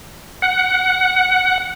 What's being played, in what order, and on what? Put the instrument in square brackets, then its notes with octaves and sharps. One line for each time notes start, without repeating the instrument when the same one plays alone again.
[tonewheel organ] F#5